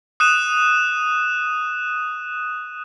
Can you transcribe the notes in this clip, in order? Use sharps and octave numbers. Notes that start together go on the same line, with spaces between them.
D#6 F#6 D#7 E7